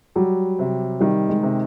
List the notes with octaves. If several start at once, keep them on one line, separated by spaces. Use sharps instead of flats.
F#3 G3
C3
D#3 G3
G#3
C3